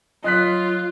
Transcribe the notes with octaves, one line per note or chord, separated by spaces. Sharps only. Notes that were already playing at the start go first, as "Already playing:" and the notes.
F#3 F4 D#5 F#6 B6